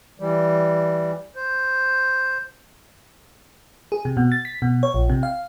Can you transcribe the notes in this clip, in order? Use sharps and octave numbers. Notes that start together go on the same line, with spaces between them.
E3 G3
C5
G#4
C3
B2
A6
B6
B2
C#5
A#1
C3
F5